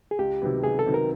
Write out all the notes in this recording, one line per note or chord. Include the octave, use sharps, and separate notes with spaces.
G#4
C#2 G4
C3 D#3 F#3 B3
C#2 G#4
A4
C3 D#3 F#3 B3
A#4